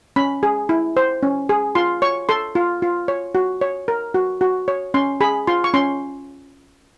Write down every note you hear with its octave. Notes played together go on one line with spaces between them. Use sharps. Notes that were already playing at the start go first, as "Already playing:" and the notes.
C#4 B5
G#4
E4
C5
C#4
G#4
F4 C6
C#5 C#6
A4 C6
F4
F4
C#5
F#4
C#5
A#4
F#4
F#4
C#5
C#4 C6
G#4 B5
F4 C6
C#6
C#4 C6